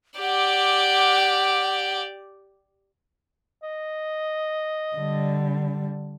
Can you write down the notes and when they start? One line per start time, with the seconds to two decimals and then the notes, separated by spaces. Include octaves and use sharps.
0.19 G4 D5 F#5
3.63 D#5
4.96 D3 G3